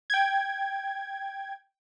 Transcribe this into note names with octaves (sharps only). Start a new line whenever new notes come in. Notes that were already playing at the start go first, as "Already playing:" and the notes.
G5 G#6